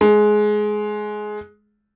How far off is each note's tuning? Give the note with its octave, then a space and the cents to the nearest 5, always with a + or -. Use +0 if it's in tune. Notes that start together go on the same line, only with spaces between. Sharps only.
G#3 +15